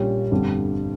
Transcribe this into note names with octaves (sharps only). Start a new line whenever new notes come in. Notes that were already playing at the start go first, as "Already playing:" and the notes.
Already playing: A#1 A#2 G3 C#4 G4
G1 F2 D3 G3